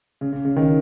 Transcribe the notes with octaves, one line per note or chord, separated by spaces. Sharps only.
C#3
C#3
C#3
D#3